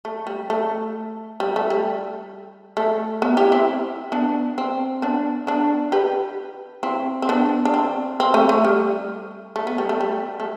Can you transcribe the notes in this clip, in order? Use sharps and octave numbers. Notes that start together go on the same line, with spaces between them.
A3
G3
A3
G3
A3
G3
A3
B3
E4 G4
C4 E4
B3 D4
C4
B3 D4
B3 D4
G4 B4
C4 E4
C4
B3 D4
D4
C4
C4
A3
A3
G3
A3
B3
G3
A3
G3
A3